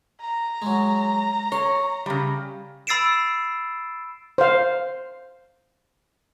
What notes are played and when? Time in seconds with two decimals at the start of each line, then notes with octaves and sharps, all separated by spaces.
0.21 A#5
0.62 F#3 G#3
1.52 C#5 C6
2.06 C#3 G3
2.87 B5 E6 A6 C7 D7 E7
4.38 C5 F5